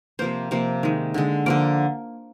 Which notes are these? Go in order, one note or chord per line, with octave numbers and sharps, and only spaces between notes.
C3 F3 A#3 C5
C3 F3 A#3
D#3 G#3
D3 G#3
D3 F3 A#3 D5